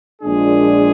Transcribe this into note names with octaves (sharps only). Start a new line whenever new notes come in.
A#1 A#2 G#3 D4 G#4